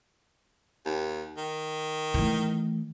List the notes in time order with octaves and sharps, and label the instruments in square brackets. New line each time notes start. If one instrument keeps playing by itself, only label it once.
[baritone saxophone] D#2
D#3
[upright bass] E3 A3